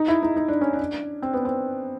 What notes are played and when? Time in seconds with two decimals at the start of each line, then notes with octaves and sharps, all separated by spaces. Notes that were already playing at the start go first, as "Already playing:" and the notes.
Already playing: D#4
0.08 E4
0.23 D#4
0.36 D#4
0.48 D4
0.61 C#4
0.73 D4
1.22 C4
1.33 B3
1.45 C4